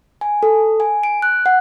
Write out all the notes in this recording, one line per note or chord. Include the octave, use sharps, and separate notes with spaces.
G#5
A4
G#5
D7
F#6
F#5